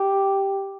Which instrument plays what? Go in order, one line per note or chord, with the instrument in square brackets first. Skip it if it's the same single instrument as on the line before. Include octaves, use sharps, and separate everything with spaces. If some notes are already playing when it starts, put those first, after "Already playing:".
Already playing: [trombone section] G4